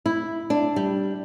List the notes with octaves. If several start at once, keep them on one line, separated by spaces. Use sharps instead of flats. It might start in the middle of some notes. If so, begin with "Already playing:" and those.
E4
D4
G3